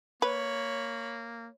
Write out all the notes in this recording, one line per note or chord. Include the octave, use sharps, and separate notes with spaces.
A#3 B4 C#5 B5